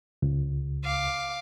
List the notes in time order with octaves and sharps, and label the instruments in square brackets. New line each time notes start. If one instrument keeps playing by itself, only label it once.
[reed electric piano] C#2
[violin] F5 D6